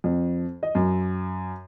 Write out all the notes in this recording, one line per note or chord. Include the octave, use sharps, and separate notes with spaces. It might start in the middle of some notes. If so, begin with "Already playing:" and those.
F2
D#5
F#2